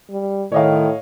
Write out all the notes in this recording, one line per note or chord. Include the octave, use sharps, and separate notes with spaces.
G3
A2 D#3 C#5 D#5 F5